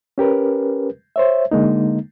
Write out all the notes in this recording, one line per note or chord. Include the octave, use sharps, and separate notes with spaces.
C#4 G4 A#4 B4
C5 C#5 E5
D3 G#3 A#3 D#4